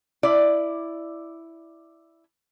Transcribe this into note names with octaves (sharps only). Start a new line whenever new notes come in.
E4 D5